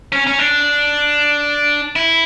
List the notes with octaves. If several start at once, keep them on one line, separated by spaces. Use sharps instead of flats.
C#4
C#4
D4
E4